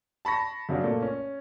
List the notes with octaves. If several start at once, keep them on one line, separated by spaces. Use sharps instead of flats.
A5 B5 C#6 A#6
F#2 C#3 F#3 D4
A#2 A3 A#3
C#4